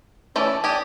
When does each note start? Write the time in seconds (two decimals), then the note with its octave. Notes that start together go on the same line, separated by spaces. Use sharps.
0.36 E3 A3 C#4 A4 D5
0.64 G4 D5 G#5 D6 D#6